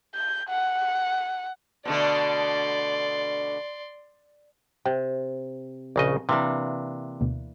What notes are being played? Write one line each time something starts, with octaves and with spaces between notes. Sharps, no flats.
G6
F#5
B2 D3 A3 D5 C6
C3 G5
A#1 C#3 D5 D#5 A#5 C#6
C3 E3 A#3 D4
D2 B2